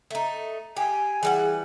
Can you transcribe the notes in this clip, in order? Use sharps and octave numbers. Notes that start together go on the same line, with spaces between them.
A3 D#4
G4 G#5
E3 G3 G#4 F#5